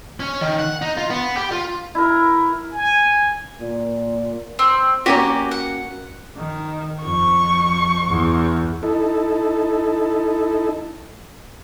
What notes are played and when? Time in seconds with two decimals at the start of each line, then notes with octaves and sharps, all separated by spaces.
0.20 C#4
0.41 D#3
0.59 F#5
0.82 D#4
0.97 F4
1.10 B3
1.37 G4
1.52 F4
1.95 E4 A#4
2.72 G#5
3.61 A#2
4.59 C4
5.06 A#3 C#4 F#4 G4
5.51 F#5
6.37 D#3
7.02 F2 C#6
8.08 E2
8.83 D#4 E4 A4